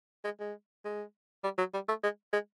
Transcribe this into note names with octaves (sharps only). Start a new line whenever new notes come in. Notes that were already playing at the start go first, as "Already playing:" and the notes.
G#3
G#3
G#3
G3
F#3
G3
A3
G#3
G#3